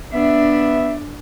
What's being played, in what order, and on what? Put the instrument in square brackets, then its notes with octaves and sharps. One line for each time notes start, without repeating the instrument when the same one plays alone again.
[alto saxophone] B3 [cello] D4 [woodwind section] E5